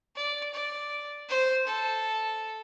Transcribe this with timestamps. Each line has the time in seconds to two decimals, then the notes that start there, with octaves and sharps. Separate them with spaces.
0.16 D5
0.54 D5
1.29 C5
1.67 A4